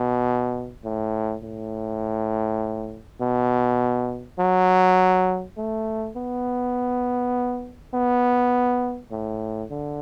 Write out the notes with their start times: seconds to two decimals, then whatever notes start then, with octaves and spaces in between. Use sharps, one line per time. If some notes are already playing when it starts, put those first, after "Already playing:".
Already playing: B2
0.84 A2
1.43 A2
3.20 B2
4.39 F#3
5.57 A3
6.16 B3
7.94 B3
9.11 A2
9.71 D3